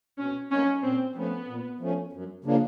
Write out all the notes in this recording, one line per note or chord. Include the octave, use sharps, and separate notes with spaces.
B2 C#4
F#3 A#3 C#4 D#4
A#2 C4
F3 A3 B3 C#4
A#2
F3 A3 C#4
F#2
C#3 F3 A#3 D4